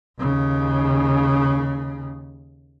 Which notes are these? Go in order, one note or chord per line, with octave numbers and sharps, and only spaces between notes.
D#2 C#3